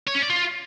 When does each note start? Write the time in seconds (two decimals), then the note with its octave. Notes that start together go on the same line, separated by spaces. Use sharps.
0.08 C#5
0.15 C#4
0.22 D5
0.30 F4